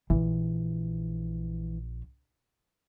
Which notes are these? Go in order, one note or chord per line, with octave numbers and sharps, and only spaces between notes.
A#1 E3